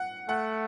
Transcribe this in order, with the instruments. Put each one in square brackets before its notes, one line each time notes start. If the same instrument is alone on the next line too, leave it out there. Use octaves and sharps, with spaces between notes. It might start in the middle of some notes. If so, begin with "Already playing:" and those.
Already playing: [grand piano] F#5
[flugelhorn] A3 [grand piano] F#5